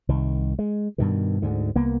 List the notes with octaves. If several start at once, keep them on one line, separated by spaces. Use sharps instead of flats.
C2 D#3
G#3
G2 B2 D#3
D2 G#2 D3
C2 A#3 B3